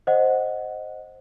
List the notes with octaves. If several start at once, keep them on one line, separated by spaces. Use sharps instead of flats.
C5 D#5 F#5